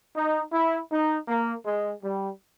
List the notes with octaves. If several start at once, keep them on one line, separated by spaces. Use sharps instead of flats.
D#4
E4
D#4
A#3
G#3
G3